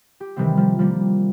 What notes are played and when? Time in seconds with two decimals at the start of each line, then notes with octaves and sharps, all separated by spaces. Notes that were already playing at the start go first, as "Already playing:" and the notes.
0.20 G4
0.36 C3 D#3 E3 G3 C4
0.57 F3 G3
0.79 F3 G3 A#3